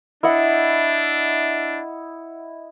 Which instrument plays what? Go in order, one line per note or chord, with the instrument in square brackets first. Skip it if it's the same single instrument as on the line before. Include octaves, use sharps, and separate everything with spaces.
[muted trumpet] D4 [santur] E4 D#5 F#5